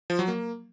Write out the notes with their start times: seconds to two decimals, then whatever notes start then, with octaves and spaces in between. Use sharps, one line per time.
0.10 F3
0.19 F#3
0.28 A#3